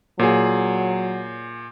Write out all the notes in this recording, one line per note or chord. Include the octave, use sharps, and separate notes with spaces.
A#2 F#3 G#4